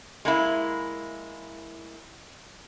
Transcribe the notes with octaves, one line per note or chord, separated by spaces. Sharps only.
G#3 A#3 E4